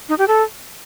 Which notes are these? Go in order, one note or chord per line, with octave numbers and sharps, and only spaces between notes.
D#4
G4
A4